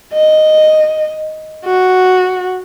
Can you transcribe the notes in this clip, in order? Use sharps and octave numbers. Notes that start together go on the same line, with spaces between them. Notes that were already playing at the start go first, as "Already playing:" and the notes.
D#5
F#4